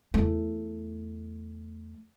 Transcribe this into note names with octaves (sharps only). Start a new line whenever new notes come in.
E2 A3